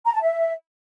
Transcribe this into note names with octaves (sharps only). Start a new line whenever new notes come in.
A#5
A5
E5